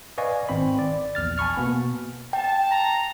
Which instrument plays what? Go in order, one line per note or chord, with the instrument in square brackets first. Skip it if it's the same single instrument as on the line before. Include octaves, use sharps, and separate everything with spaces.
[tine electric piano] B4 D5 D#5 F5 G#5 C#6
G#1 C4 B5
D5
A#1 E2 F6 A6
G#5 A5 B5 C#6 F6
B2 A#3 B3
[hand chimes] G5 [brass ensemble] A5
[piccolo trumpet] A#5